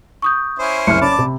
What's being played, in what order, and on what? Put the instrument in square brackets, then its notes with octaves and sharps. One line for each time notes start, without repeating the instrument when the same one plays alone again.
[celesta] C#6 D#6 G6
[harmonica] C#4 E4 C5
[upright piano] F#1 C2 C6 [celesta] F6 C#7
[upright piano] C#4 [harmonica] D5 A5 D6 [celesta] B5
[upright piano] C3